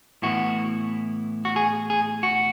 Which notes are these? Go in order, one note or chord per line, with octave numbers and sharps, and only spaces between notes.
A2 E3 B3 E4 F#4
F#4
G#4
G#4
F#4